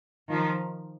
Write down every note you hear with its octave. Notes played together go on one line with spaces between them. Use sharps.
D#3 F3